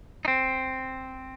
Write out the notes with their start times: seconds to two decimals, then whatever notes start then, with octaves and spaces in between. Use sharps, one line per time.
0.25 D#4
0.28 C4